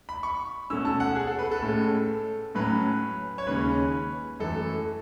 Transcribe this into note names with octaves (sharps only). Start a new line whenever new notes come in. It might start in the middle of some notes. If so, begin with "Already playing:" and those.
B5
C#6
B2 A3 C#4 E6
A5
F#5
G#4
A4
B4
A4
A2 G#3 C#4
A2 F#3 C#4 B4
C#5
D#2 C#3 G#3 C#4 B4
F#2 E3 A3 A4